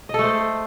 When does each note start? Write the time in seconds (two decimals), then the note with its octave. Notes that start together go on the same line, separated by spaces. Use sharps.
0.09 D#5
0.14 A4
0.19 A3
0.24 C5